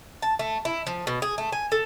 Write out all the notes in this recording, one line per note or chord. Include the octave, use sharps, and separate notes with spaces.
A5
A3
E4
F3
B2
G#4
A3
G#5
A4